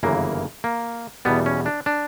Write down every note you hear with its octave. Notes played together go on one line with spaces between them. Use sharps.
G1 F#2 C#3 E3 A#3
A#3
E2 B2 G3 B3
C#4
D4
D4